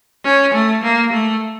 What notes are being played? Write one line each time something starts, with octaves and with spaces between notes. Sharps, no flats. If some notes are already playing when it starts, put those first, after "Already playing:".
C#4
A3
A#3
A3